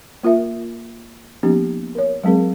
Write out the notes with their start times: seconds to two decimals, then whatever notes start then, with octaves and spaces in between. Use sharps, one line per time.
0.23 A#3 F4 A#4 E5
1.43 F3 A#3 B3 C#4 D#4 G4
1.95 A#4 C#5
2.24 F#3 G#3 C4 G#4 A#4